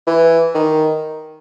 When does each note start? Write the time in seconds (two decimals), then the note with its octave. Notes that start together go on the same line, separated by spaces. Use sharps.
0.07 E3
0.55 D#3